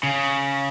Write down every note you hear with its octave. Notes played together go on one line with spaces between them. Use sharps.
C#3